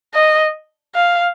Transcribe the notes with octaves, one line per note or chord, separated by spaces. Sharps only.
D#5
F5